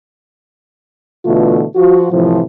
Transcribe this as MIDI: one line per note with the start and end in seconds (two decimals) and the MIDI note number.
1.25 1.63 47
1.25 1.63 50
1.25 1.63 52
1.25 1.63 57
1.25 1.63 65
1.76 2.07 53
1.76 2.07 65
1.76 2.07 66
2.12 2.41 45
2.12 2.41 48
2.12 2.41 52
2.12 2.41 53